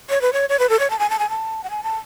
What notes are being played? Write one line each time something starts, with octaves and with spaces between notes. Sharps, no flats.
C#5
B4
C#5
C#5
B4
A4
C#5
A5
G#5
A5
G#5
A5
F#5
G#5
A5